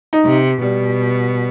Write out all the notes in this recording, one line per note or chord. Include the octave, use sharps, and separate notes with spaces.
D#4
C3
B2 G3